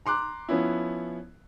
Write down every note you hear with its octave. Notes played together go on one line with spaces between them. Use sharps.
A#5 C6 D6 F#6
F3 B3 C#4 E4